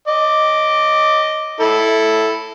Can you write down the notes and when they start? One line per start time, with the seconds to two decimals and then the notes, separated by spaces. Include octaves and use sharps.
0.08 D#5 D6
1.60 E4 A4